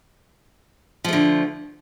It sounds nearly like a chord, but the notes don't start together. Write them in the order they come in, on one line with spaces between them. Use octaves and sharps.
F3 A3 D3